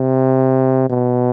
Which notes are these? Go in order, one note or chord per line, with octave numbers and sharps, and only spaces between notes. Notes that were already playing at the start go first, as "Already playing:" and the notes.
Already playing: C3
B2